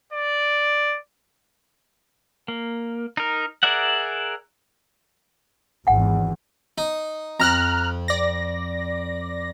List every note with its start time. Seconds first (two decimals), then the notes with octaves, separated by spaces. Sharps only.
0.12 D5
2.48 A#3
3.17 D#4 A#4
3.63 G#4 A#4 D5 E5 F#5
5.87 G#1 E2 F#5 G#5
6.78 D#4
7.40 F2 A#5 F6 F#6
8.08 D5 A#6